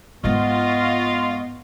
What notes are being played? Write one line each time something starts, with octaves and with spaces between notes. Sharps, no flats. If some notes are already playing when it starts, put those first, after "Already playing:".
G#2 G#3 B3 F4 D#5 C#6